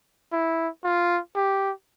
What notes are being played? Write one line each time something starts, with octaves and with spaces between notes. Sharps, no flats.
E4
F4
G4